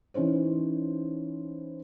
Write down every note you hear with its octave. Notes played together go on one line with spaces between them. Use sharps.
E3 C#4 D#4 C5 C#5